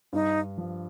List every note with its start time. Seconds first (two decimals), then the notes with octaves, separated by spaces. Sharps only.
0.13 G2 D#4
0.58 F3